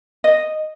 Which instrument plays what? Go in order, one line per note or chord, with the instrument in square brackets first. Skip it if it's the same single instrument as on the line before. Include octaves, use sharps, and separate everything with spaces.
[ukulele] D#5